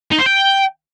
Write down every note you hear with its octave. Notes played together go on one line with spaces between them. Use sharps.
D#4
C5
G5